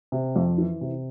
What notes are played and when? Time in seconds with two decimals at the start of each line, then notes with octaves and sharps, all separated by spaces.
0.12 C3
0.36 F2
0.58 E3
0.81 C3